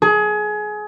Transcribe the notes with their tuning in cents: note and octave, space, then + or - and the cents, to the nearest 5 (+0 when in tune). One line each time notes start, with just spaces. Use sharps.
G#4 +25